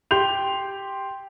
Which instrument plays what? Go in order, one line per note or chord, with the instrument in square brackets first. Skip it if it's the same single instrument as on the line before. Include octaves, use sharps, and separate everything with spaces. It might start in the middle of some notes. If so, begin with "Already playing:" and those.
[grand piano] G4 C6 G6 F7